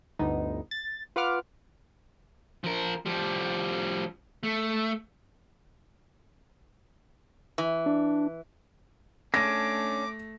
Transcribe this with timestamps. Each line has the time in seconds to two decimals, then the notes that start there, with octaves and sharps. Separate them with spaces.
0.19 G1 D2 B3 D#4
0.71 A6
1.16 F4 B4 F#5 D6 F6
2.64 F3 A#4
3.06 F3 G3
4.43 A3
7.58 E3
7.86 D4
9.34 A3 C#4 D4 D6 A#6